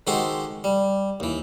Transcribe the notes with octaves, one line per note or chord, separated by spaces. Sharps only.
D#3 G#3 F#4 G4 A4 C5
G3
D#2 E3